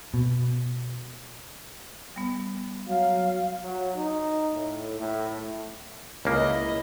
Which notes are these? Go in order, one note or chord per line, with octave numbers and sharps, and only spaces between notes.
B2
G3 B3
F#3 F5
F#3
D#4
A2
A2
C#2 A#3 E4 D#5